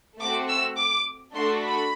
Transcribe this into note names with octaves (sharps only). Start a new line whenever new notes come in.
A3 C4 F#4 D6
E6
D6
A3 D4 F#4 A4 C6
B5